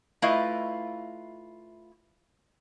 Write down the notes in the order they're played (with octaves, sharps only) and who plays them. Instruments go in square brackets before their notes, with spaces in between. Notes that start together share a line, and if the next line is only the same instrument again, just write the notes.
[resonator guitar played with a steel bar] A3 E4 F4 B4 D#5 F5